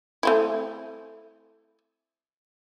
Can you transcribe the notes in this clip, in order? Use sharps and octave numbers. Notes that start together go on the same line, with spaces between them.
A3 C4 E4